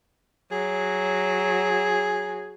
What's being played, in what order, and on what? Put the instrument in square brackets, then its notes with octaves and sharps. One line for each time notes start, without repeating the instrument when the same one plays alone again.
[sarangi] F#3 [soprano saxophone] G#4